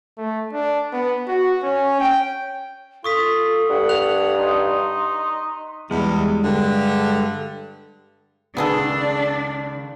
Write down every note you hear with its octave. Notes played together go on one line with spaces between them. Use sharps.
A3
D4
B3
F#4
C#4
G5
F4 A4 C#6 D#6 B6
G2 F#5
F#6 F7
D#4 C6
E2 G3 G#3
G2 D3
C#2 D#3 B3 D4 G#4 A4